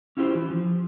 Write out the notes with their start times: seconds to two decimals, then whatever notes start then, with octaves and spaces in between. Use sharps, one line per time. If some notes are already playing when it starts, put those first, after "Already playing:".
0.17 C#4 E4 F4 G4 B4 C5
0.35 E3
0.51 F3